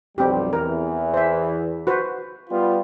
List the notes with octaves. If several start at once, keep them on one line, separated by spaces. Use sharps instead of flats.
B1 F2 G3 C4 G4
E2 E3 A#4
C5 E5
F#4 B4 C5
G3 B3 F4